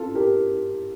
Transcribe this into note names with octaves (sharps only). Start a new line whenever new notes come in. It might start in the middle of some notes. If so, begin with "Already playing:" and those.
Already playing: F4 A4
G4 A#4